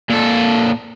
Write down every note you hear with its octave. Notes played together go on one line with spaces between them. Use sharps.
A#2 A4